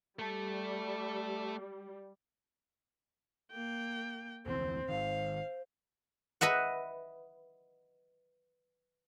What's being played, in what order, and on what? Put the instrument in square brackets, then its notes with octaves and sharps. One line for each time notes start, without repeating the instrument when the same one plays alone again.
[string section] G3 [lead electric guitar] A3 A4
[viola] A#3 G5
[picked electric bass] F1 D2 E3 [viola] C4 [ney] C5
[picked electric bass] G#1 D#3 [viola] F5
[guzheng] B4 D#5 E5 F#5